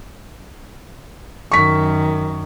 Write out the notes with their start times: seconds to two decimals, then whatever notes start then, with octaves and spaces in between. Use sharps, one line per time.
1.52 F#2 D#3 C#6 B6